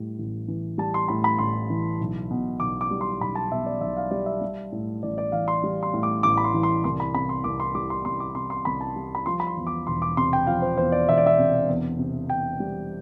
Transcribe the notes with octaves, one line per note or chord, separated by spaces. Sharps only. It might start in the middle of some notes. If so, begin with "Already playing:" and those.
Already playing: A2 G3
A1
E3
G3 A5
C6
A2 B5
B5
A1 C6
E3
B1
B2
B1 D6
D6
G3
C6
B1 B5
A5
B2 E5
D5
B1 E5
F5
G3 D5
E5
G3
A2
A1 D5
D5
E3 F5
C6
G3
C6
A2
D6
A1 D6
B5
C6
E3
C6
C2 C6
B5
C3 B5
C6
C2 D6
C6
G3 D6
C6
C2 C6
D6
C3 C6
C6
C2 B5
A5
G3
B5
F3 C6
B5
C6
E2
D6
E1 C6
D6
C3 C6
G5
F3 F5
C5
E2 C5
D5
E1 E5
D5
E5
C3
E2
C3
E2 G5
G3